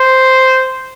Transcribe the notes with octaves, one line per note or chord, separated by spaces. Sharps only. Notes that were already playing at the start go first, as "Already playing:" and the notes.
Already playing: C5